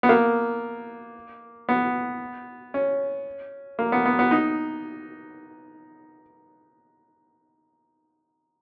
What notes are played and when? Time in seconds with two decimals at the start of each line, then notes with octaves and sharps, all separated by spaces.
0.03 B3
0.09 A#3
1.69 B3
2.74 C#4
3.79 A#3
3.92 B3
4.06 B3
4.19 B3
4.31 D#4